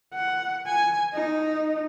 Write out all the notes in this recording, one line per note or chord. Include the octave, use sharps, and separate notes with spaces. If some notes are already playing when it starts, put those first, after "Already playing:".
F#5
G#5
D#4